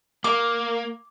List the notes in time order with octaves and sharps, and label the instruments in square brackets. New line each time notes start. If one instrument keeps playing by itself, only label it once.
[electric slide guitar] A#3 [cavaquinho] D6